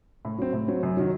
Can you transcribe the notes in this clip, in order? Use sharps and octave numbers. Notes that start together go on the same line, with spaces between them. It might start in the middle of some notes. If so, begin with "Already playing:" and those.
A2
F#3 C4
A2
F#3 C4
F#2
D#3 F#3